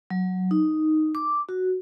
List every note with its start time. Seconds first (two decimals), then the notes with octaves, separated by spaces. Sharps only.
0.10 F#3
0.51 D#4
1.15 D6
1.49 F#4